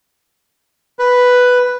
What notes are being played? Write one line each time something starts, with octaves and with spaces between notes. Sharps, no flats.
B4